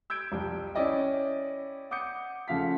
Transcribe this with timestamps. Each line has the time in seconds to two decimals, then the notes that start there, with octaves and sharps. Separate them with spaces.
0.10 E6 G6 G#6 D7
0.32 C2 F2
0.75 C#4 E4 D5 D#5 G5
1.91 F#5 D6 D#6 G6 C#7
2.48 C#3 F3 A3 F5 F#5 B6